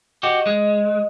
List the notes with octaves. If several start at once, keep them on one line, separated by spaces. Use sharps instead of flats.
F#4 G4 D#5
G#3